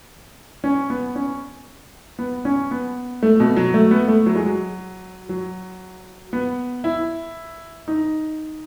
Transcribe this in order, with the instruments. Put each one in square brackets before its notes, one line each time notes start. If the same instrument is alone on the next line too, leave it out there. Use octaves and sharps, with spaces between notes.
[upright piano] C#4
B3
C#4
B3
C#4
B3
A3
B2
F#3
A3
B3
A3
F#3
G#3
F#3
F#3
B3
E4
D#4